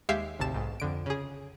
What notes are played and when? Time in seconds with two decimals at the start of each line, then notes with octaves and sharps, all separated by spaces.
0.09 D#2 G#3 G4 E5 F5 C7
0.39 G#1 D2 C3 A5 E7
0.54 B1 G#2
0.80 F2 D3 D7
1.06 C#3 G#4